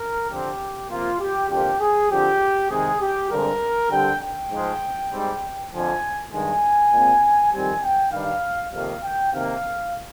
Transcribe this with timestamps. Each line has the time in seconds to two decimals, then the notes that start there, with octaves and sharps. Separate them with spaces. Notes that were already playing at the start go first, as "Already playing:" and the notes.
Already playing: A#4
0.30 D3 F3 C4 G4
0.90 C3 F3 A#3 F4
1.20 G4
1.50 F2 D3 F3 A#3 G4
1.80 G#4
2.11 D3 F3 C4 G4
2.71 C3 D#3 G#3 G#4
3.01 G4
3.31 G2 D3 G#3 C4 A#4
3.91 D3 G3 C4 G5
4.21 G5
4.51 G#2 F3 G#3
5.12 G#2 G3 C4
5.72 F2 D3 F3 G#5
6.32 G2 D#3 G#3 G#5
6.92 A#2 G#3 C4
7.52 F2 D#3 G3 C4 G#5
7.83 G5
8.12 G2 D#3 G3 F5
8.73 F2 C3 D#3 A#3 F5
9.03 G5
9.33 C3 D#3 A#3 F5